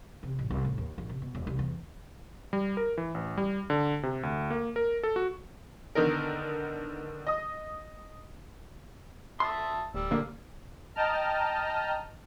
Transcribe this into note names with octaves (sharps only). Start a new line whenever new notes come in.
C3
A1
C2
A2
D#2
A#1
C3
B2
E1
C2
E2
G3
A#4
E3
A1
G3
D3
C3
D2
A#3
A#4
A4
F#4
D3 D#3 B3 D#4 A#4
D#5 D#6
E5 A5 C6 D#6
D1 G3 E6
A#2 D3 A#3
D#5 G5 A5 A#5 F6